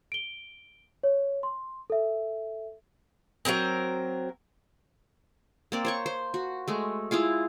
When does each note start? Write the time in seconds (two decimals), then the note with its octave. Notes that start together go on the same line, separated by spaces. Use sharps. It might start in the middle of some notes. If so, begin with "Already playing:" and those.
0.12 D7 G7
1.03 C#5
1.43 C6
1.90 A4 E5
3.45 F#3 G3 C4 A#4
5.72 A#3 C4 D5
5.85 C5 C#5 C#6
6.06 C5
6.34 F#4
6.68 G#3 A3
7.11 E4 F4 G#4 F5